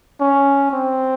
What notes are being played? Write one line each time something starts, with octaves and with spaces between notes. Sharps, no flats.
C#4
C4